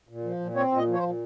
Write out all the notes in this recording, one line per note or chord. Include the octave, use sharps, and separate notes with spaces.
A#2
F3
A#2
C4 C#5
A#2
D#5
F3
C#5
C5
A#2